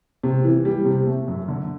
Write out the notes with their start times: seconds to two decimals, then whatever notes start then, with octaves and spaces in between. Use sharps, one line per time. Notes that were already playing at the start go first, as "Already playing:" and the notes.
0.23 C3
0.44 E3
0.65 G3
0.85 C3
1.06 A3
1.28 F#2
1.48 D3